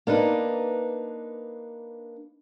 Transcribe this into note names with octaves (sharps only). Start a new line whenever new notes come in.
A#3 D4 D#4 B4